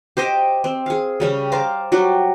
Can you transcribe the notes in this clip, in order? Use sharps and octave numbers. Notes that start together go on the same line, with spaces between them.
G4 C5 D#5 G5
C4
G#4 F5
C#3 G3 C#4
C5 D5 F5 A#5
F#3 G3 F#4 D5